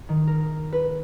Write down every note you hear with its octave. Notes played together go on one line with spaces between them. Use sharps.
D#3
A#4
B4